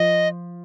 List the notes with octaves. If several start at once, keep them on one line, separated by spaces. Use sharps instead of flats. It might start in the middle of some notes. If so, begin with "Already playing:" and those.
Already playing: F3 D#5